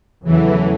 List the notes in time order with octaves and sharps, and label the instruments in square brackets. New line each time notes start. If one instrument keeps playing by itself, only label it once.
[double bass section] E2 C#3 F#3 A3 [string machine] E3